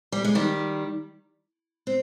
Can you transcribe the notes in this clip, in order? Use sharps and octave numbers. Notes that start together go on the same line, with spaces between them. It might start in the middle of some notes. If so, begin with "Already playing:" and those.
G3
G#3
D#3 G3
C4